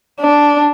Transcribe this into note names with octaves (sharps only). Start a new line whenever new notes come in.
D4